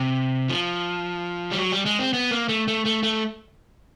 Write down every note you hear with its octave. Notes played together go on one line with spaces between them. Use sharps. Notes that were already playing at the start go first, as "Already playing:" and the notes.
Already playing: C3
F3
G3
F#3
G3
G#3
C4
B3
A#3
A3
A3
A3
A3